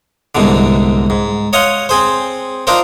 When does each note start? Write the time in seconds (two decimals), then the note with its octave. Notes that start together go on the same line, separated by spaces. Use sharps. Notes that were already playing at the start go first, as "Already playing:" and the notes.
0.35 C2 G#2 B2 D3
1.10 G#2
1.53 C#5 D#5 F5 F#5 C6
1.89 C4 G#4 C5
2.67 D4 D#4 F4 A#4 C5